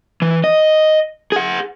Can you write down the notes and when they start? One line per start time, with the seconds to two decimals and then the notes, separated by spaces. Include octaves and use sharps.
0.22 E3
0.44 D#5
1.32 G#4 F#5